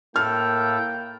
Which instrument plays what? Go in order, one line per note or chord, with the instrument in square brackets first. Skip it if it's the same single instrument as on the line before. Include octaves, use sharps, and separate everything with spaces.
[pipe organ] A2 A4 [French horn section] A#3 [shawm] G5 [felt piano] F6